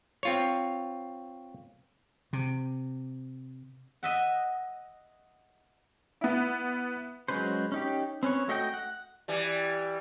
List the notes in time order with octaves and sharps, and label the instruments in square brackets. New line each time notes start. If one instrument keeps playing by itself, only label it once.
[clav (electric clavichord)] C4 F4 C#5
[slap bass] C3
[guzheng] D#5 E5 F#5
[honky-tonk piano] B3 E4
[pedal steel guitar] F#3 G#3 C#4 B4 C5
C#4 D#4 G4
C4 C#4 B4 C#5
A3 F#4 D#5 E5 G5
F#5
[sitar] E3 G3